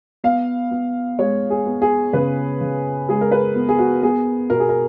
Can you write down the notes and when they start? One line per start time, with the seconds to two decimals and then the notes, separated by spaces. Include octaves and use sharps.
0.24 B3 F5
0.71 B3
1.19 G#3 C#5
1.50 G#4
1.66 B3
1.82 G#4
2.13 C#3 B4
2.61 C#3
3.09 G#3 G#4
3.21 A#4
3.31 B4
3.55 B3
3.69 G#4
3.79 F#4
4.02 B3 G#4
4.50 B2 A#4
4.60 G#4
4.69 A#4